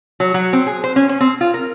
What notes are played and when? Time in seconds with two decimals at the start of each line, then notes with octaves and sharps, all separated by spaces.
0.20 F#3
0.34 F#3
0.53 C4
0.67 G#4
0.84 C5
0.96 C#4
1.09 C#4
1.21 C4
1.41 F4
1.54 A#4